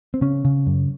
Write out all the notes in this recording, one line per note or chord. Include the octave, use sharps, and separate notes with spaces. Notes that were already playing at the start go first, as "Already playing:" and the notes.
C4
C#3 C#4
C#3
F#2